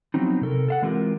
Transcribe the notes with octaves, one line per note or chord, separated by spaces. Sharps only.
F3 F#3 B3 C4 D#4
C3 A4 A#4
A4 F5 F#5
E3 G#3 C4 F4 G4 A#4